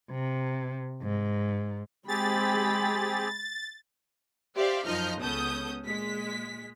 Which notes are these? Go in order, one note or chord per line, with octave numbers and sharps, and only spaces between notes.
C3
G#2
G#3 C4 G4 G#4 B5 A6
G4 C5 D5 E5 F5
F#2 F3 D#4 D#5 F6 G6
C#2 B3 C#4 A4 D#6 G6
A#2 G#3 B6